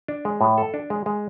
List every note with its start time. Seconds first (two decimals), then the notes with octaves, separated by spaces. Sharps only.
0.08 D4
0.25 G#3
0.41 A2
0.58 A4
0.74 D4
0.90 G#3
1.06 G#3